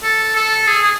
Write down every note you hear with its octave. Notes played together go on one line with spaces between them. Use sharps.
A4
A4
G#4
G#4